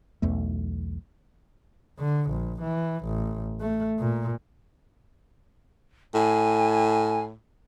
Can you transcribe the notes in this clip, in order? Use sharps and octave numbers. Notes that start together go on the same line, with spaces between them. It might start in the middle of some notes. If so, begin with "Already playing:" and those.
B1 E2 A3
D3
A#1
E3
A1
A3
A#2
A2 G#5